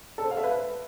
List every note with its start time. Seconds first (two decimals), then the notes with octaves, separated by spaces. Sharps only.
0.18 A4
0.24 C5
0.31 F5
0.37 E5
0.44 B4